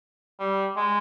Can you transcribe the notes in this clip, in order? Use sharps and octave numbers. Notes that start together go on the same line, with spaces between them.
G3
G#3